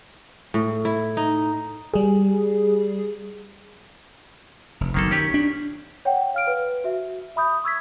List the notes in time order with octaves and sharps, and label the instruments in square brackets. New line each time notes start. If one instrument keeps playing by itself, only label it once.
[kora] A2
E4
D#4
[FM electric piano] G3 G#4
[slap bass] F1
[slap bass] F#1 B1 [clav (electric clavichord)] D#3 A#3 A4
[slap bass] D#3 [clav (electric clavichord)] C#4 G4
[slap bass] D4
[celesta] C#5 F#5 G5
F5 F6 D7
B4
F#4 E5
E5 B5 D#6 G6
C#6 E6 G#6 B6